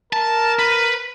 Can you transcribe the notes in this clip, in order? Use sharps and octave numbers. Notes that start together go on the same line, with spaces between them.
A#4 A5
B4